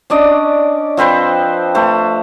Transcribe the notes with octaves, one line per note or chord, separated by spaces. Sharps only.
C#4 D4 D5 D#5
F3 C4 B4 C5
A3 B4 C5